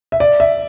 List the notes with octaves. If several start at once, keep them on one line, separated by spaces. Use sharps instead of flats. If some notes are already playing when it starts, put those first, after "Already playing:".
E5
D5
E5